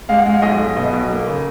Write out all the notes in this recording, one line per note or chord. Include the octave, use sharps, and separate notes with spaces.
G#3 F5
F#5
G#3 F5
B1 D#5
B1
B2 D#5
B1
A#3
C#3